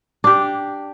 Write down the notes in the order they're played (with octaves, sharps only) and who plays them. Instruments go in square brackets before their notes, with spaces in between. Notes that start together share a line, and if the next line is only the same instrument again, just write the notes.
[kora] D4 G4